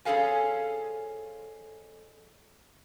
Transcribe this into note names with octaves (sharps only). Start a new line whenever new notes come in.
F2 C#4 G#4 A4 F5 G#5